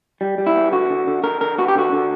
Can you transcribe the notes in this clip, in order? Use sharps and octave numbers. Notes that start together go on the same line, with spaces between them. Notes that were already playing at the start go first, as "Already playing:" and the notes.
G3
G3
E4
B3
D3 F#4
D3
D3
D3 A#4
D3 A#4
B3 F#4
G4
D3 F#4
D3